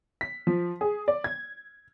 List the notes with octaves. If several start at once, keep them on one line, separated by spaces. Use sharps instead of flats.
B6
F3
G#4
D5
G#6